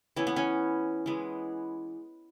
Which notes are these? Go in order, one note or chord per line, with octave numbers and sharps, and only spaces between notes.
E3 B3 C#4
B3
C#4
E3 G#3 B3